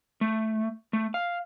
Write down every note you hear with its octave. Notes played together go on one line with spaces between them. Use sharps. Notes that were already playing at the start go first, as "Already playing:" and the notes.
A3
A3
F5